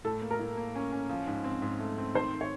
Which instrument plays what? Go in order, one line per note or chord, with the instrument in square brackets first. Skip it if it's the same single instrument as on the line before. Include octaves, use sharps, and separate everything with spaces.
[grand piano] A2 [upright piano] A4
[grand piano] A#3
[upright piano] A#4
[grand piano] A2
A#3
C#4
C#4
F3
G#2
C4
G#2
A3
C4
[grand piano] D#3 [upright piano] C5
[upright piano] C#5